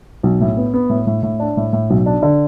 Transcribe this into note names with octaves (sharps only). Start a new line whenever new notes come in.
B1
A2
B3
B3
A2
A2
A2
D4
A2
A2
B1
D4
D3